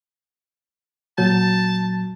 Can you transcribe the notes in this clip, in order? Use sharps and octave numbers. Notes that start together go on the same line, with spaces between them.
A#2 F#3 A5 G6